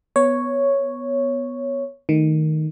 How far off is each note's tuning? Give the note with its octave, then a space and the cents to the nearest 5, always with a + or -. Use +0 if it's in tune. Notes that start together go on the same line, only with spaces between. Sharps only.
B3 +0 C#5 +0
D#3 +0 A3 +0